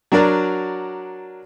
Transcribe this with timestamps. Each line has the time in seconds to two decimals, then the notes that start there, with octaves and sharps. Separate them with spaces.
0.12 F#3 D4 F#4 A#4 D5